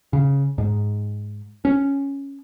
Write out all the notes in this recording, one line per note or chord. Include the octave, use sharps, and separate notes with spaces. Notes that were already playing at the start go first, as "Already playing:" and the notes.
C#3
G#2
C#4